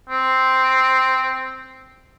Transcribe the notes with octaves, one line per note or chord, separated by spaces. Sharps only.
C4